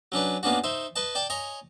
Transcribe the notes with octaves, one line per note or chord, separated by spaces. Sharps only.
F#3 C#4 D4 B4
A#3 B3 C#4 D4 F#4
D#4 C5 E5
B4 D#5 A5
D5 G5 A5
C#5 D#5 G#5 A#5 D#6